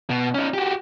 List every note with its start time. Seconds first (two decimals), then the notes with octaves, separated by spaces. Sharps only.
0.10 B2
0.34 C#4 D#4
0.54 F#4 G4